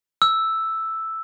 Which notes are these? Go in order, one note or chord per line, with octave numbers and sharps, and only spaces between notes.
E6